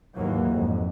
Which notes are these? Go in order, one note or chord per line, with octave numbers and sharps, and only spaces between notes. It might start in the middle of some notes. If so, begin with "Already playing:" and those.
D#2 G#2 E3 F#3 A#3
G#1 F2